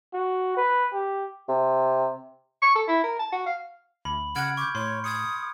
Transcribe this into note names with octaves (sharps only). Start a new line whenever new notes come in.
F#4
B4
G4
C3
C#6
A4
E4
A#4
A5
F#4
F5
D2 B5
C#3 F#5 F6 G#6 D7
C#6 D6 G6
A2 C#5 C6
D#6 G#6 C#7